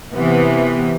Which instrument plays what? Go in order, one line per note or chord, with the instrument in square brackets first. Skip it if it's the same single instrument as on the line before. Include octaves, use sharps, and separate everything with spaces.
[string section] C3 E3 B3